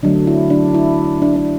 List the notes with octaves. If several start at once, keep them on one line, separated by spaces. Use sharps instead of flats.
D3 F#3 A3 D4
E4
D4
E4
D4
D4